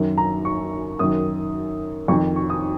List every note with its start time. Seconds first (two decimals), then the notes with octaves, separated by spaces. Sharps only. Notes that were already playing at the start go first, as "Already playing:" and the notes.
Already playing: F#2 D#3
0.18 A#5
0.45 C#6
0.99 F#2 D#3 D#6
2.08 F2 C#6
2.11 D#3
2.36 C#6
2.50 D#6